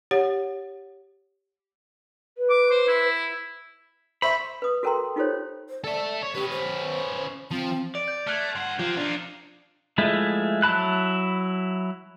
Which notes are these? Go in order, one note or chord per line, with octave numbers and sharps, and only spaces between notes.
G4 C#5 F#5
B4
D6
C5
E4
C5 E5 B5 C#6
B4 D#6
F#4 A4 A#4 G5 A#5 C6
D#4 F4 G4 A4 C5 C#5
C5
A4 D5 E5
C#5
C#4 G4 B4
C5
F3 C4
D5 F7
G6
A3 F6 F#6 G#6
G2 F#5 C6 C7
F3 G4 C5
D4 D#4 F4
F3 G#3 A3 E4
F#3 E4 A5 B5 F#6